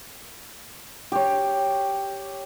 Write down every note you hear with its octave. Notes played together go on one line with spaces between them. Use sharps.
G4 C#5